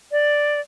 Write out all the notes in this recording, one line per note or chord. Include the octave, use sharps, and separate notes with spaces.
D5